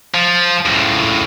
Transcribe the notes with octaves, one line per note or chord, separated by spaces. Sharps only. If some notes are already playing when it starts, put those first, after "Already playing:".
F3
C#2 A2